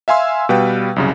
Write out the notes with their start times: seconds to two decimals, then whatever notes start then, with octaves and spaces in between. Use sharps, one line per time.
0.08 E5 F5 G#5 C6 E6
0.49 B2 G3 B4 F5 G5
0.96 C2 F#2 C#3